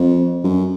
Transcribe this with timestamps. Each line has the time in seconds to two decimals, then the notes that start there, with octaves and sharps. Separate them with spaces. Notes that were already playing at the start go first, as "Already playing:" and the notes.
Already playing: F2
0.44 F#2